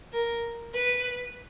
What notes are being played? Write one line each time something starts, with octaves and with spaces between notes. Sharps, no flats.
A#4
B4